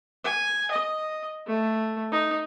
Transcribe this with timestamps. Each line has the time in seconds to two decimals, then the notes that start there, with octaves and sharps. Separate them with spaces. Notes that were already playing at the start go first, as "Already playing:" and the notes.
0.24 G#5
0.71 D#5
1.47 A3
2.12 D#4